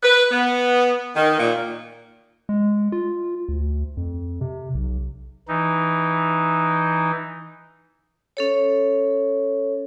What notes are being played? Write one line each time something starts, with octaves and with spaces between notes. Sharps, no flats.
B4
B3
D#3
A#2
G#3
F4
D2
F2
C3
B1
E3 D#4
C#4 A4 C#5